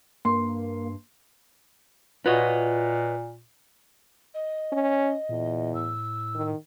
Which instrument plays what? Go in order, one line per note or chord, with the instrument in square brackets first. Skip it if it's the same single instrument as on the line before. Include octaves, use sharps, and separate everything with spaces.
[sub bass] G2 [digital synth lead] A#3 [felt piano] C6
[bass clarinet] A#2 [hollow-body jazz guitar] F4 F#4 [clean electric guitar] B4 C#5 D#5
[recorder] D#5
[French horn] C#4
[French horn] E2 [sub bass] A#2
[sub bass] A2 [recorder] E6
[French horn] D#3